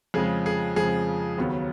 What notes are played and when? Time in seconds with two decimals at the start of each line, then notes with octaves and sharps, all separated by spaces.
0.14 F2 C#3 F3 G#3 G#4
0.46 G#4
0.76 F2 C#3 F3 G#3 G#4
1.38 D#2 C#3 F#3 B3